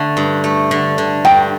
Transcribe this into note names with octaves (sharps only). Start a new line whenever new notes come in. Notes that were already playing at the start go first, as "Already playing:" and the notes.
Already playing: D3 A3
G2
A3
D3
D3
G2 G5